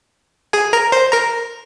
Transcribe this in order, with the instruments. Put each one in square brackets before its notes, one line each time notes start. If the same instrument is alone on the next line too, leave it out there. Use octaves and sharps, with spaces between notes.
[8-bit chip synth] G#4 G#5
A#4 A#5
C5 C6
A#4 A#5